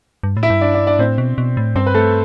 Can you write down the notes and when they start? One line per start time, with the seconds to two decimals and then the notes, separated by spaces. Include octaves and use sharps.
0.23 G2
0.37 A2
0.43 E4 E5
0.50 G2
0.61 D4 D5
0.75 D4 D5
0.87 D4 D5
0.99 A2 C4 C5
1.18 B2
1.38 B2
1.57 A2
1.76 G2 C4 C5
1.87 B4
1.94 A3 A4